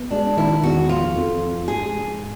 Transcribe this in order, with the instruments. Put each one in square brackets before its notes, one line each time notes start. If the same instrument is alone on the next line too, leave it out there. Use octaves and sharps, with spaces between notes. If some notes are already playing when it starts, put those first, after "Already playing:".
Already playing: [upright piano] B3
[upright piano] G#3 [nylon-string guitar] D4
[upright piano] D#3 [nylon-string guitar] E4
[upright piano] E2 [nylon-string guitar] F#4
[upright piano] F3 [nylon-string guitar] F4
[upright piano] F2
F3
[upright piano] G#2 [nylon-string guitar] G#4
[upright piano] G#2